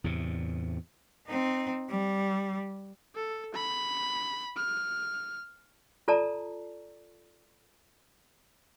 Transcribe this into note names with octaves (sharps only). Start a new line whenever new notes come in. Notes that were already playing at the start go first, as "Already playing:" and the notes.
E2 A2 C3
C4 D#4
G3
A4
B5
F6
F4 A4 D5 A5 A#5